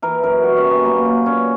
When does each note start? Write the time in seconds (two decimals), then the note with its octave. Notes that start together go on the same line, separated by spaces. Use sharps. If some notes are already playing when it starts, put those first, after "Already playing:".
0.02 E3 A#4
0.23 F#2 A#4
0.43 G3 F#4
0.57 C#4
0.64 F#2
0.71 B3
0.85 F#3 A#3
1.05 F#3 B3
1.26 A#2 C#4